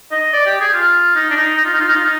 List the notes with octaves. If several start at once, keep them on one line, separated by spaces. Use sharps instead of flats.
D#5
D5
G4
G#4
F4
D#4
D4
D#4
D#4
F4
D#4
F4
D#4
F4
D#4